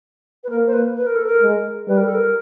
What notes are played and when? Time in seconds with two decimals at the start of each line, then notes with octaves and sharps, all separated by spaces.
0.44 B4
0.50 A#3 A#4
0.67 C5
0.73 B4
0.96 B4
1.06 A#4
1.16 A4
1.26 A#4
1.42 G#3
1.88 G3 B4
1.97 A#4
2.06 A4
2.15 A#4